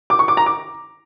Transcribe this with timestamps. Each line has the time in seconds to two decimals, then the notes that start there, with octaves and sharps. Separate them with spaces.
0.10 D6
0.19 C#6
0.28 D6
0.37 A#5
0.46 D6